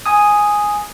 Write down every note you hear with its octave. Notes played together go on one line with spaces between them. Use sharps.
G#5 D#6